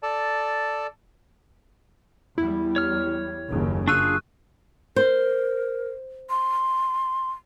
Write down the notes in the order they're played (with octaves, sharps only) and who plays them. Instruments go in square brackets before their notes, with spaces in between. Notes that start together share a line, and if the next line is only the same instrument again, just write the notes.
[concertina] A4 D5 A5
[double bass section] E2 G3 [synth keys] E4
[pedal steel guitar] C#5 F6
[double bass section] F#1 D#2 C#3
[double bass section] F#2 [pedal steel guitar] D4 F4 G#4 [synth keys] C#6 E6 D#7 [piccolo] F#6
[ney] A#4 [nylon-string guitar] C5
[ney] C6